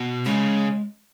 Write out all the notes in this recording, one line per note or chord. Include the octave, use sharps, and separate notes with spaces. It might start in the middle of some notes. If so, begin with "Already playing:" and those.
Already playing: B2
C#3 G#3